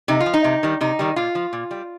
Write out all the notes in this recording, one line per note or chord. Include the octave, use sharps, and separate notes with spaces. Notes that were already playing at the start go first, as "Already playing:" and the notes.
C3 D#4
F4
F3
D#4
C3
D#3 G3
C3 D#4
D#3 G3
A#2 F4
F3
A#2
G3